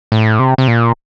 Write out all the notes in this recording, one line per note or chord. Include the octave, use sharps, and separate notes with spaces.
A2
C3
C3
A#2